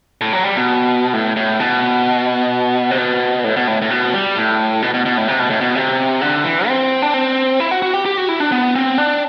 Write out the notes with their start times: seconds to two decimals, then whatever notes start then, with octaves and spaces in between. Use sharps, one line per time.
0.21 A2
0.33 F#3
0.44 G3
0.55 B2
1.14 A2
1.36 A2
1.59 B2
2.91 C3
2.98 B2
3.44 A2
3.56 B2
3.67 A2
3.82 A2
3.90 B2
4.13 G3
4.36 A2
4.82 B2
4.94 B2
5.05 B2
5.17 A2
5.28 C3
5.39 B2
5.50 A2
5.61 B2
5.75 C3
6.21 D3
6.44 E3
6.67 C4
7.02 D4
7.14 C4
7.60 E4
7.71 F#4
7.82 F#4
7.94 G4
8.05 G4
8.17 F#4
8.29 E4
8.40 D4
8.52 B3
8.75 C4
8.98 D4